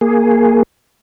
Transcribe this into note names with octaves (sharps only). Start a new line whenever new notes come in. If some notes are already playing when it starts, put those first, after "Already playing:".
A#3 G#4